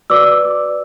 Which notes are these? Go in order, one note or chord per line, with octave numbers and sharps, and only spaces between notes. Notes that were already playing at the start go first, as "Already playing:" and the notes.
F#4 B4 D5 D6 E6